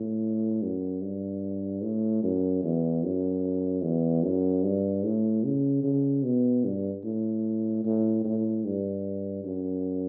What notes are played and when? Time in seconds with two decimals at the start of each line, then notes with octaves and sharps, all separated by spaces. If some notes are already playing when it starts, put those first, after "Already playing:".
Already playing: A2
0.62 F#2
1.02 G2
1.82 A2
2.23 F#2
2.63 E2
3.04 F#2
3.83 E2
4.23 F#2
4.63 G2
5.03 A2
5.44 C#3
5.84 C#3
6.23 B2
6.65 G2
7.04 A2
7.85 A2
8.24 A2
8.65 G2
9.45 F#2